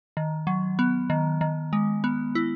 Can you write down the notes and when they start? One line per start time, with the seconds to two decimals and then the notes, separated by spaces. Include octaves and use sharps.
0.17 D#3
0.47 F#3
0.79 B3
1.10 D#3
1.41 D#3
1.73 G#3
2.04 B3
2.35 E4